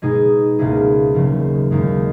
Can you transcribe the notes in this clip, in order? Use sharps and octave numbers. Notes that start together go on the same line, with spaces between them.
B2 G#3 D#4 G#4
C#2 B2 A#3 E4 G#4
E1 D#2 C#3 F#3
E1 D#2 D#3 G#3